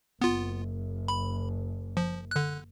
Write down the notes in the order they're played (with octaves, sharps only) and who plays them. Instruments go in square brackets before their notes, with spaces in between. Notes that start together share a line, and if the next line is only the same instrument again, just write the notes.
[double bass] F#1 [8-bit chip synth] B3 F4
[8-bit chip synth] B5
F3
D3 F#6